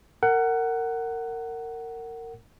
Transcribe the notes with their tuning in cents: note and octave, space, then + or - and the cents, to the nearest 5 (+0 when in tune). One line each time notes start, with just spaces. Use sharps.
A#4 -25 F#5 +15